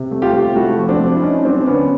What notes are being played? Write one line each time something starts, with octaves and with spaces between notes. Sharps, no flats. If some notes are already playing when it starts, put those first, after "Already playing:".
Already playing: C3
A3
F4 G4
C3
A3 E4 F#4
F3
C4 D4
A3
E4
A3 C#4 D#4
F#3 C4 D4
D3 B3 C#4